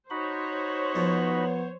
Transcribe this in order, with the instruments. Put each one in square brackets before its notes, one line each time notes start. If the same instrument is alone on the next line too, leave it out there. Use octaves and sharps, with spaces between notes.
[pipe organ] D#4 F#4 B5 [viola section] C5 C#5
[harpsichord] F2 [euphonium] B3